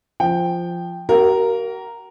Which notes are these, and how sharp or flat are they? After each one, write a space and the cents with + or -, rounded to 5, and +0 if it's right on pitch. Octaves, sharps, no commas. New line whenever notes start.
F3 -5 G5 +0
F#4 +45 A#4 +0 F5 +0